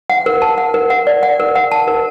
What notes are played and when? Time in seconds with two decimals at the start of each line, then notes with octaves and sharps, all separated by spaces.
0.10 F#5
0.26 A#4
0.42 A5
0.58 F#5
0.74 A#4
0.90 F#5
1.07 D5
1.23 F#5
1.40 A#4
1.55 F#5
1.72 A5
1.88 A#4